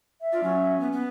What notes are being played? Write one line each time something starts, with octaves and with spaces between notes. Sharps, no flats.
E5
D4 F4 D5
F#3 C#4
B3
B3